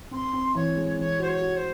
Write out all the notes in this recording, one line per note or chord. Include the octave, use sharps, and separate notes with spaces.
C4 C6
C4
E3 C#5
G#3
E3 C#5
F#4 C5
C#5
F#4
C5